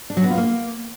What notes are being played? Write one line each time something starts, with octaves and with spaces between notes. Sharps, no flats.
D4
F#3
B3
F4
A#3